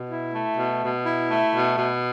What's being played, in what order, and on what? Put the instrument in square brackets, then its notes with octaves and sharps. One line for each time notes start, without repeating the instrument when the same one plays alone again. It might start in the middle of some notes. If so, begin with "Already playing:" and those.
Already playing: [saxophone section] B2
E4
A3
B2
B2
E4
A3
B2
B2